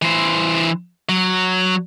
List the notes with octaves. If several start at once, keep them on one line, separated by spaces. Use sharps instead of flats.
E3 C5
F#3